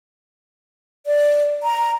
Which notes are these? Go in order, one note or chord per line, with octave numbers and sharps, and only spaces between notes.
D5
A#5